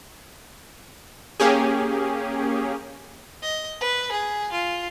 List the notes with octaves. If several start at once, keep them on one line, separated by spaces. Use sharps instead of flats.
A#3 C#4 G4 G#4
D#5
B4
G#4
F4